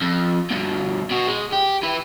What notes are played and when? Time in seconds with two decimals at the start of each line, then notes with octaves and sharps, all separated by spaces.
0.01 F2
0.50 G2 B2
1.10 B2 F#4
1.27 G#3
1.52 G4
1.83 E3 B4